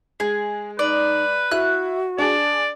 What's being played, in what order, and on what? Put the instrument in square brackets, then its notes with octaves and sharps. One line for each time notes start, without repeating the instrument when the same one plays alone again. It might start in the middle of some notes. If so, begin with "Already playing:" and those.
[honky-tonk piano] G#3 [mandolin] G#4
[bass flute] D#4 [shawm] B4 [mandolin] D5
[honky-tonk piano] E4 [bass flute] F#4 [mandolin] F#6
[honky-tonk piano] D4 G#4 [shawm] D5